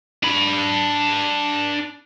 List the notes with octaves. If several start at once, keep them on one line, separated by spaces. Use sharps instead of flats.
D4 B5